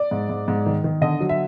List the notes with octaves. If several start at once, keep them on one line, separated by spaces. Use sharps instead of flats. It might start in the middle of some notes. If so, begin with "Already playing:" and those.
Already playing: D5
G#2
G#2
G#2
D#3
D#3
D3 D#5
F#3
E5